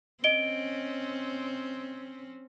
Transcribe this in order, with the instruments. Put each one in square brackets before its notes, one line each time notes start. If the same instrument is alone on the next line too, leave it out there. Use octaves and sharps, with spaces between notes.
[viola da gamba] C4 C#4 [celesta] D#5 D7 G7